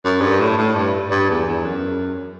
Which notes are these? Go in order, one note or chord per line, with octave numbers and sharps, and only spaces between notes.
F#2
G2
A2
A2
G2
G2
E2
E2
F#2